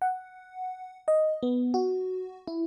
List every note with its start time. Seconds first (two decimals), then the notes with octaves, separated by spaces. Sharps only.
0.02 F#5
1.08 D#5
1.43 B3
1.74 F#4
2.48 E4